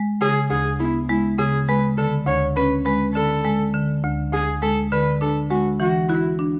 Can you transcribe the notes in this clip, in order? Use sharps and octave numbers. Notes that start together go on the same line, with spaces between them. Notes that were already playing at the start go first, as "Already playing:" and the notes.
Already playing: G#3
C#3 G#4
D2 G#4
B3 E4
G#3 E4
C#3 G#4
G#3 B4
D3 A4
D2 C#5
C#4 B4
G#3 B4
D3 A4
G#3
D3
D2
D2 G#4
G#3 A4
D3 B4
D4 A4
G#3 F#4
E3 F#4
E4 F#4
D4